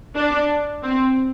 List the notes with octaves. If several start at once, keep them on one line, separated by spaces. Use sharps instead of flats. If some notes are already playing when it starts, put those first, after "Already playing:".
D4
C4